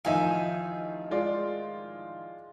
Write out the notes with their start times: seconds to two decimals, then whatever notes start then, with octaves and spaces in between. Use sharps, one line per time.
0.05 A1 D#3 F3 D#4 E5 F5 G#5
1.11 G#3 F4 D5